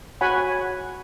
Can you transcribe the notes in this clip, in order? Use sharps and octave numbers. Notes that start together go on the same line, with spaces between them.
F#4 C#5 F#5 G#5 B5